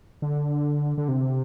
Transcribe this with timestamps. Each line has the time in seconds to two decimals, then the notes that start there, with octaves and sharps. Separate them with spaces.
0.22 D3
0.98 D3
1.08 C3